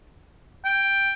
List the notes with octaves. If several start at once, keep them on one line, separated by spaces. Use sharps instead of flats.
G5